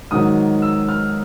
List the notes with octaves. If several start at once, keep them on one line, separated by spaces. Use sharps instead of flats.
G#2 D#3 F#3 D#6
E6
F6